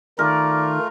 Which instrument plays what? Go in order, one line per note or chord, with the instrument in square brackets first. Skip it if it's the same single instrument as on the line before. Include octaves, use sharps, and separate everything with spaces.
[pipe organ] D#3 D#4 [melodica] A3 F4 [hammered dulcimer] A#4 [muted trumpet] D5